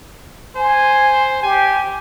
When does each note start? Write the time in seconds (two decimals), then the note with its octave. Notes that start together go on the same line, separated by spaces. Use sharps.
0.56 C5 G#5
1.43 G4 G#5